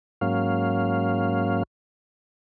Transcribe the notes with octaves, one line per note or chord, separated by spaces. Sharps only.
G#2 F#3 A#3 C#4 F5